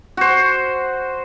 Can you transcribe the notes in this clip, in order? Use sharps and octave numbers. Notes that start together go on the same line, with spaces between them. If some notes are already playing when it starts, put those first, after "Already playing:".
F#4 C5